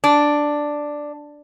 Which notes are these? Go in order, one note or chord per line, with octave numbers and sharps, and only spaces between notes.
D4